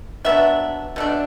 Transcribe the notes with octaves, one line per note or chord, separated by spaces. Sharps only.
F#3 B3 D4 E5
B2 A3 D4